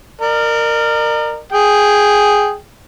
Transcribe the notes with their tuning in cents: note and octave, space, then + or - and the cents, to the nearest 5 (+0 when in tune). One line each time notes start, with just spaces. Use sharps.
A#4 -10 D5 +45
G#4 +0 G5 +0